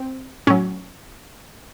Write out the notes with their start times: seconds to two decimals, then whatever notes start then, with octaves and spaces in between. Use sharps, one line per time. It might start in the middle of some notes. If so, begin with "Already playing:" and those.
Already playing: C4
0.47 A2 F#3 C#4